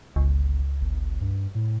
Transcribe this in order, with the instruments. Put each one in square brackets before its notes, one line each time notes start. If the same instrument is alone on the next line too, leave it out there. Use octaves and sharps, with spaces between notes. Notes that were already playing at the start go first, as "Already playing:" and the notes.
[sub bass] G1 [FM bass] C#2
[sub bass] G1
G2
A2